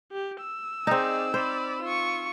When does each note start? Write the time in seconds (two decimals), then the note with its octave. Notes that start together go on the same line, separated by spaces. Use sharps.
0.12 G4
0.41 E6
0.87 C4 D#4 G#4 D5
1.34 C5 D5 B5
1.82 F4 C#6